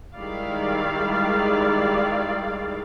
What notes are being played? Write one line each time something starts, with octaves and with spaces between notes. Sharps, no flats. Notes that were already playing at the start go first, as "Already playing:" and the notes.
D#3 G3 G#3 E4 D5 F5